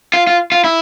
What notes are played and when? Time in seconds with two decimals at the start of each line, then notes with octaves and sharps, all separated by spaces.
0.14 F4
0.27 F4
0.52 F4
0.64 E4